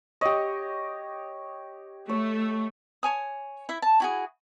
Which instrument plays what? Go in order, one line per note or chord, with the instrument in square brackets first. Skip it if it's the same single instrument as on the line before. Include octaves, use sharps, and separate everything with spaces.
[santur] G4 C#5 [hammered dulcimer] D#5
[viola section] A3 [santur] C#5
[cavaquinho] C#5 G#5 D#6
E4 E5
A5
E4 F#4 G#4